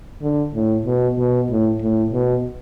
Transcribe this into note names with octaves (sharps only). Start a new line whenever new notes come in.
D3
A2
B2
B2
A2
A2
B2